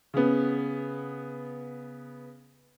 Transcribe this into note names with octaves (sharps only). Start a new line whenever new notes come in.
C#3 B3